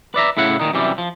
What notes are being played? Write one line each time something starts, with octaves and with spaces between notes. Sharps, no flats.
B4 D5 E5 A#5
A2 C#3 E4 F#5
A#2 D#3 D#4
F#2 C3 E3 G3
F3